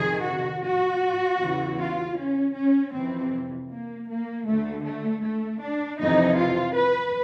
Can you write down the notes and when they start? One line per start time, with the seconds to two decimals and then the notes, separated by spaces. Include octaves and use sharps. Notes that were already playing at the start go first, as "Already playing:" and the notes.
Already playing: F2 C3 D#3 G#4
0.24 F#4
0.63 F#4
1.39 E2 C#3 E3
1.78 F4
2.16 C#4
2.54 C#4
2.93 F2 C3 E3 C4
3.70 A#3
4.08 A#3
4.46 D2 D3 A3
4.84 A3
5.23 A3
5.61 D4
5.99 F2 C3 E3 D#4
6.38 F4
6.76 B4